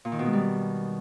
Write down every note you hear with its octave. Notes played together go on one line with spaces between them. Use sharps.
A#2
D#3
B2
G#3
G3